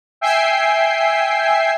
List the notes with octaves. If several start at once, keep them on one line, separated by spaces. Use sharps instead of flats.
E5 G5 G#5 C7